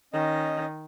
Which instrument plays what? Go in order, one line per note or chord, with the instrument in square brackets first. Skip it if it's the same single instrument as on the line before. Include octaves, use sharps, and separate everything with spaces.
[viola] D#3 [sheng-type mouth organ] C#4 D#5